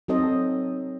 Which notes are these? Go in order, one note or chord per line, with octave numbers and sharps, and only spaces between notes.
F#3 C4 D#4 A4 C5 D#5